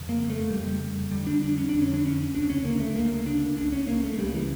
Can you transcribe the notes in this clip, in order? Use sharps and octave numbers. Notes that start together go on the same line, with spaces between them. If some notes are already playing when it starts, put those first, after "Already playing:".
Already playing: F2 C#3
A#3
A3
F2 C#3 G3
F2 D3 G3
D4
D4
C#4
F2 D3 D4
C#4
D4
C#4
D2 C#3 D4
C#4
A#3
A3
D2 C#3 A#3
D4
C#2 C#3 D4
C#4
A#3
A3
A3
C#2 C#3 G3
E3